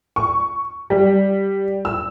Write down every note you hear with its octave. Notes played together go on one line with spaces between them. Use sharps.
C#6
G3
E6